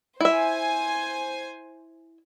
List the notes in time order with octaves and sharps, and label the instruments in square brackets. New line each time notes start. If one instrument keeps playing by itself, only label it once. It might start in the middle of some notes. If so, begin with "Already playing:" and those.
[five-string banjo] E4 E5 [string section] C5 G#5